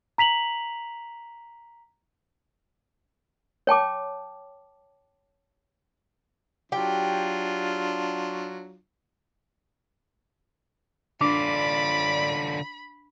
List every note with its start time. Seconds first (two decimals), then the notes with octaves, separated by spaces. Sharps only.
0.18 A#5 B6 F7 F#7
3.67 C#5 G5 A5 D6
6.72 F#3 D4 F4 G4 G5
11.21 D3 D4 F4 D5 B5